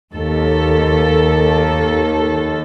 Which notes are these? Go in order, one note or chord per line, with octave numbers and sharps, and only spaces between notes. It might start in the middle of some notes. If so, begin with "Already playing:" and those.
D#2 A4